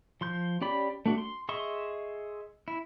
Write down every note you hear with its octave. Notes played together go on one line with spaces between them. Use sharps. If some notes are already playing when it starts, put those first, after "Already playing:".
F3 C6 G6
C#4 G4 D5 B5
A3 D4 F#4
C6
G#4 D#5 E5 C6 C#6
E4